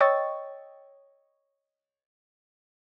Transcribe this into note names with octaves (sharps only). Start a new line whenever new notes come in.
C#5 D#5 G5 C#6 E6 A6